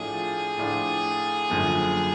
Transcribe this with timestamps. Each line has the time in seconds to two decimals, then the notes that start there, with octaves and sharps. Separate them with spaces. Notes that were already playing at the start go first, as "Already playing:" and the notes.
Already playing: A2 F3 A3 D4 F4 G#4
0.58 A2 F3 A3 D4 F4
1.50 F#1 F#2 D3 F3